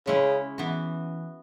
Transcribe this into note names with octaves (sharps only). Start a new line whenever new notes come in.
C#3 G#3 C#4 E4
E3 B3 F#4